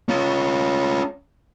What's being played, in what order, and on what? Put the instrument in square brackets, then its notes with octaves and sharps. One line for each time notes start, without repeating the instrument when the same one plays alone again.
[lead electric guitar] C#4 F4